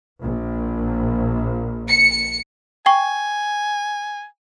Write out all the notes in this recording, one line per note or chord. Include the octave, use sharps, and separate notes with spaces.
A#1
C#7
G5 G#5 C#6